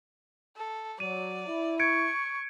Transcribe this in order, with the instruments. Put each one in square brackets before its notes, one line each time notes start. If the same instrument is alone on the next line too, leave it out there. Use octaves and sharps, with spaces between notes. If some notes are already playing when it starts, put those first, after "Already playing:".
[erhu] A4
[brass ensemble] F#3 [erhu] D5 [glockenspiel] D#7
[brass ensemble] E4
[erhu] C#6 [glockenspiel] G#6 C#7 D7